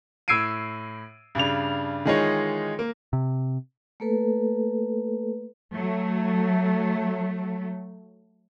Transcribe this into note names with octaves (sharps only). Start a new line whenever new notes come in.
A2 E6 G#6 C7 D7 D#7
G2 C#3 D4 F7
D#3 E3 G#3 D#4 F4 C#5
A#3
C3
A3 A#3 A4 B4
F#3 A3